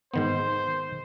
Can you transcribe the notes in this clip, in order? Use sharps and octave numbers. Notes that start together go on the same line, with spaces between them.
G#2 D#3 B3 C5